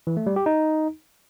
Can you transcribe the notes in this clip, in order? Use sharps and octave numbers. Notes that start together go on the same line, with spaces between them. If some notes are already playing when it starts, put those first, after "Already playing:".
E3
A3
G3
G4
D#4